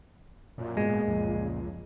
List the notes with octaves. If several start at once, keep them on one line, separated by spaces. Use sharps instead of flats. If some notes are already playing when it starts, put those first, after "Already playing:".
F#2 A#2
F#1 G#2 B2 G#3 B3
C#2 F#2 F3